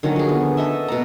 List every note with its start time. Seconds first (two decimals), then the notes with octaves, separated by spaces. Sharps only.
0.03 D3 D#3 F#3 C#4
0.16 F3 G#4
0.29 B3
0.57 A4 D#5 E5
0.88 B2 F#5 A#5